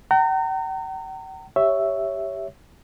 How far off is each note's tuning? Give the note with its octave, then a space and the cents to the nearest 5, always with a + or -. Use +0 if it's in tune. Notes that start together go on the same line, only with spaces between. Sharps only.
G5 -45 A#5 -30
G4 +0 C#5 +0 E5 +0